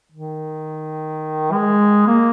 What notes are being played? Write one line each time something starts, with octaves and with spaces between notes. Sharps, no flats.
D#3
G#3
A#3